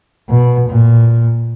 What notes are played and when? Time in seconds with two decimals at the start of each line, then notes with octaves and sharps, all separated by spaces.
0.29 B2
0.69 A#2